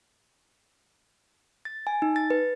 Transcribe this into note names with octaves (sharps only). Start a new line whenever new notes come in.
A6
G#5
D#4
A6
B4